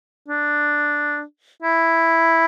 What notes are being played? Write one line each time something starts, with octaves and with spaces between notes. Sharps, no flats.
D4
E4